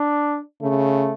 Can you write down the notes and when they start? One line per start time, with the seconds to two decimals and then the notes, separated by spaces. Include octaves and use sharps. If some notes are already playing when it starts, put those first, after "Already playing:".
Already playing: D4
0.61 C#3 A3